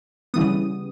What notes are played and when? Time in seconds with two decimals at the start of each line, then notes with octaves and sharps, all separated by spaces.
0.34 C#3 E3 G3 B3 D#6